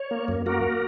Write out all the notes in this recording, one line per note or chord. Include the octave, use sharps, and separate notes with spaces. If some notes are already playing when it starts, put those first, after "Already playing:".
Already playing: C#5
A#3
F#2
A#3 F#4 A#4